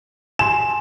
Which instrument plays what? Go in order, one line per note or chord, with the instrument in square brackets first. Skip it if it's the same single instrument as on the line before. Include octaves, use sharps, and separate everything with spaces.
[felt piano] G#5 C6 [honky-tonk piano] E7